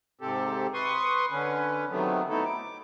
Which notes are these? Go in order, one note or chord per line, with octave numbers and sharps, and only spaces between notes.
G#2 C3 C4 G4 A4
B4 C6 C#6 D#6
D3 C#4 B4
C3 D#3 F#3 A3 B3
A3 B3 D#4 E4 A4
D6